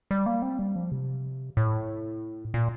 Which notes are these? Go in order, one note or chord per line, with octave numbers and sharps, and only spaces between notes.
G3
A#3
C4
G3
F3
C3
A2
A#2